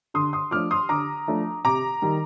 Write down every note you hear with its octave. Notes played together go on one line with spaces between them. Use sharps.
D3 C6 D#6
C6 D#6
F3 A3 D4 D6 F6
C6 D#6
D3 A#5 D6
F3 A3 D4
C3 A#5 D6
D#3 G3